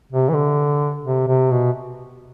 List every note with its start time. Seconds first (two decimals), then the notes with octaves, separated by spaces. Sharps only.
0.12 C3
0.29 E3
0.35 D3
1.05 C3
1.28 C3
1.51 B2